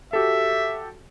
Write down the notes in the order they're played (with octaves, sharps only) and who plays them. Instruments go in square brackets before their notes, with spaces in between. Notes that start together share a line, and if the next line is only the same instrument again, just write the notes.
[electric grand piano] F#4 G4 A4 [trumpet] E5